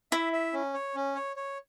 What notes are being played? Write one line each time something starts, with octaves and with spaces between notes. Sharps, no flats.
E4 E5
E5
C#4
C#5
C#4
C#5
C#5